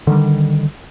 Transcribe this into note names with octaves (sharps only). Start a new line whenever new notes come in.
D3 D#3 G3